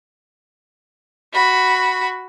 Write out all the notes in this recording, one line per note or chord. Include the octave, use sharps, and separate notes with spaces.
F#4 B5